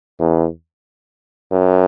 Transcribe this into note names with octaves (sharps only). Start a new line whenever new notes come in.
E2
F#2